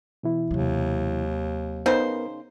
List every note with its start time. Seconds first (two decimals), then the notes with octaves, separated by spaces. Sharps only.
0.23 B2 E3 E4
0.51 D#2 C3 F#3
1.86 C#3 B3 D#4 A#4 C5